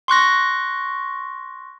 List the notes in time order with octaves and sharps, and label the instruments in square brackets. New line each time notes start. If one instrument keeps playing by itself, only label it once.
[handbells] C6 C#6 F#6 A#6